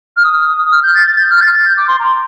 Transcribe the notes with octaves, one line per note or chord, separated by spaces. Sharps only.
F6
D#6
F6
G6
A6
A6
G6
F6
A6
A6
G6
D6
C6
A#5